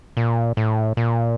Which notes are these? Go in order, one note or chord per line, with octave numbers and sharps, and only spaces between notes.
A#2
A2
A#2